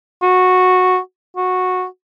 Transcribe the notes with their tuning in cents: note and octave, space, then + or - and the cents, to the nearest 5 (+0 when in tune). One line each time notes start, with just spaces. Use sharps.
F#4 -10
F#4 -10